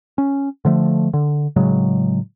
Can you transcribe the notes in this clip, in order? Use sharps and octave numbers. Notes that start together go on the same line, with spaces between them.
C#4
D3 F3 A3
D3
A2 C#3 F#3 G#3